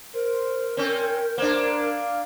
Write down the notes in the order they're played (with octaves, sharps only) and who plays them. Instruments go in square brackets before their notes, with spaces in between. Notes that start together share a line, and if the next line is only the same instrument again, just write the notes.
[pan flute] A#4 [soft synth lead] C5
[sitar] C4 C#4 [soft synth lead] G6
[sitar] A#3 D4 [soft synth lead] C5
[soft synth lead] F5